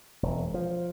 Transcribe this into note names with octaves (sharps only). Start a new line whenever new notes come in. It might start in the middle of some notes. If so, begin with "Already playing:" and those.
E1
F3